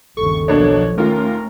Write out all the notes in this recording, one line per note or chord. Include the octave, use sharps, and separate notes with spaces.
G1 D#2 C#3 A4 C#6
B1 B2 F3 A#3 D4 C#5
D#2 A3 C#4 F4 A#4